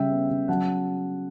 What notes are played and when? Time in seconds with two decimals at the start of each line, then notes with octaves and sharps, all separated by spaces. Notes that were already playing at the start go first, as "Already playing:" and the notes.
Already playing: C#3 G3 E5 G5
0.11 B3
0.30 C#3
0.48 F#3 F#5 A5